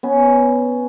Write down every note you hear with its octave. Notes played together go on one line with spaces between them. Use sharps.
B3 C#4